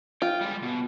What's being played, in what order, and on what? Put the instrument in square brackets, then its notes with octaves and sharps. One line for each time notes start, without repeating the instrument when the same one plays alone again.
[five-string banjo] F4 [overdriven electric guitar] G5
[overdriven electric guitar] G3 G#3
B2